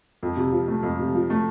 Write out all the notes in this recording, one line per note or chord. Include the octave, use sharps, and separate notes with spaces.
F2
C3
F3
A3
F2
C3
F3
A3